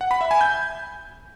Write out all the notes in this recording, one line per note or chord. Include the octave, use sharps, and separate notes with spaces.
F#5
B5
E5
G#5
G6